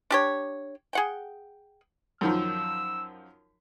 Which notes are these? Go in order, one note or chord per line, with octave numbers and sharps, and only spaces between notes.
D4 G4 C#5
G#4 F#5 G5
F#2 D#3 F3 E6